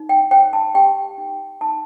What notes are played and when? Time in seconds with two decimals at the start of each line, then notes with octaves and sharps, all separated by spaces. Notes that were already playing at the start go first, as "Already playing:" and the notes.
Already playing: D#4
0.09 G5
0.31 C5 G5
0.53 A5
0.75 G4 G5
1.18 D#4
1.61 D#4 A5